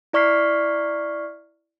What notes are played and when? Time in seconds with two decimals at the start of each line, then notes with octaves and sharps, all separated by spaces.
0.13 E4 D5 C#6 F6 B6 C7